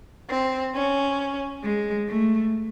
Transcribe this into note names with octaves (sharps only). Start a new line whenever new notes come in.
C4
C#4
G#3
A3